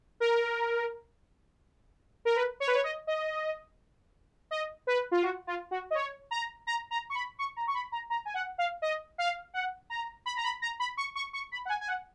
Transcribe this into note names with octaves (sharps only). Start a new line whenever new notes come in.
A#4
A#4
B4
C#5
B4
C#5
D#5
D#5
D#5
B4
F4
F#4
F4
F#4
D#5
C#5
A#5
A#5
A#5
C#6
B5
C#6
A#5
C#6
B5
A#5
A#5
G#5
F#5
F5
D#5
F5
F#5
A#5
B5
A#5
B5
A#5
B5
C#6
C#6
C#6
B5
F#5
G#5
G#5
F#5